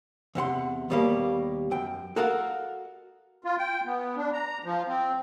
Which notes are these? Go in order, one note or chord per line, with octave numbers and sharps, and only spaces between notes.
E2 C3 F#5 C6
D#2 B2 G3 G#3 A#3
F#2 G5
F#4 A4 A#4 D#5 F5 F#5
F4
G5
B3
D4
A#5
F3
C4